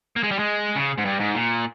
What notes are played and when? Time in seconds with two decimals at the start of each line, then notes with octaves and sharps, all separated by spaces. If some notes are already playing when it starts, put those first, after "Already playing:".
0.16 A#3
0.23 G#3
0.31 G3
0.39 G#3
0.76 C#3
0.98 G#2
1.05 G2
1.20 G#2
1.35 A#2